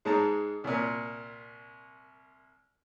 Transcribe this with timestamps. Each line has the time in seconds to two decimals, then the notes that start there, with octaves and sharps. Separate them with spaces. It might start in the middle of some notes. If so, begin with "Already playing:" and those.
0.05 G#2 G#3 A5 A#5
0.64 C2 A#2